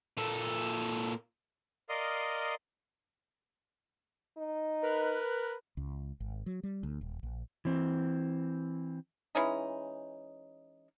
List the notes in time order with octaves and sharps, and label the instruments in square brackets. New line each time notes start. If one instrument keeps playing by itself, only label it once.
[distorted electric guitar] A#2 A4
[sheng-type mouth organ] A#4 D5 D#5 F5 C6 D#6
[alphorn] D#4
[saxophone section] A#4 B4
[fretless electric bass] C#2
G#1
F#3
G3
D2
D#1
A#1
[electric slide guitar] E3 C4
[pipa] E3 G#3 C#4 D#4